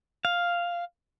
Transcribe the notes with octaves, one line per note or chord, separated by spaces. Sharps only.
F5